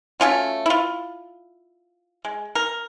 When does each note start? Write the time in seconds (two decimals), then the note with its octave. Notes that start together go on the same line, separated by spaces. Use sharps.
0.20 A3 C#4 F4 F#4
0.66 E4 F4
2.25 G#3
2.55 A#4